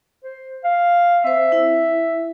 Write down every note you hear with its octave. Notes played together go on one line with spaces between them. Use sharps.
C5
F5
C4 C5 E5
E4